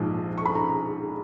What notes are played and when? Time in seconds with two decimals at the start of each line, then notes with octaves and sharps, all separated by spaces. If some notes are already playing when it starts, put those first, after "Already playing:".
Already playing: A#1 G#2 F3 G#3
0.38 C#6
0.45 B5
0.55 A#5